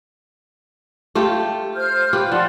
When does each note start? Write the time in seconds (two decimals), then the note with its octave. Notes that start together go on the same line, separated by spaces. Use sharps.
1.15 A3 F4 G4
1.76 C5 F6 G6
2.13 F4 G4 B4
2.32 F3 D5 F#5 C6